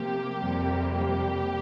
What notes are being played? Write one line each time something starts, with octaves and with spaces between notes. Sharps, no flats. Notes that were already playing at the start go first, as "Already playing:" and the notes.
Already playing: C3 F3 A#3 G4
F2 C3 G3 A#3
G4